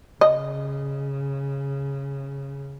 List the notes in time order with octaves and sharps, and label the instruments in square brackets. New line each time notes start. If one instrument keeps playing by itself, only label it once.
[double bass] C#3 [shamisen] D#5